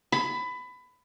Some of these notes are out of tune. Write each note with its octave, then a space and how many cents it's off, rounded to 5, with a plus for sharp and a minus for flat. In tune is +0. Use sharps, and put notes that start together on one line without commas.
B5 +20